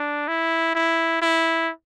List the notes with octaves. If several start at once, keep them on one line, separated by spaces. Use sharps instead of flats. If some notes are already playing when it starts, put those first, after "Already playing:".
Already playing: D4
E4
E4
E4